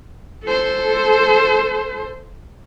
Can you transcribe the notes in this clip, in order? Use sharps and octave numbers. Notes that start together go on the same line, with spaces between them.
A4 C5